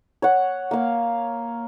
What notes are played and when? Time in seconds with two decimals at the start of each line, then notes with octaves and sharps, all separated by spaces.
0.22 C#5 F#5
0.71 A#3 F5